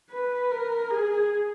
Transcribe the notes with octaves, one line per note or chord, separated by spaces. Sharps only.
B4
A#4
G#4